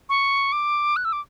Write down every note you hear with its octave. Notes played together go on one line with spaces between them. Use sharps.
C#6
D6
F#6
E6
D6